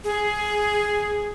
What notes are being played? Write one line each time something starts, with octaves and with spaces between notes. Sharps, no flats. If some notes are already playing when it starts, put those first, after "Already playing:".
G#4